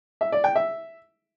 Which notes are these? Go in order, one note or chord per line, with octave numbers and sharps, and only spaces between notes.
E5
D5
G5
E5